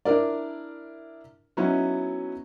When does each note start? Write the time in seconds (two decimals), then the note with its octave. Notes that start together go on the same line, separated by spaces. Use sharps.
0.05 D4 E4 A#4 D5
1.57 F#3 B3 C#4 D#4 E4